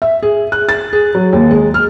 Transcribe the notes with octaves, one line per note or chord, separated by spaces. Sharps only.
E5
G#4
F#6
A6
G#4
F#3
D#2
G#3
F6